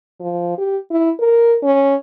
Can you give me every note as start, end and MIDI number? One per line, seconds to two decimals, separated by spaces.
0.20 0.53 53
0.58 0.77 67
0.90 1.10 64
1.20 1.56 70
1.63 1.95 61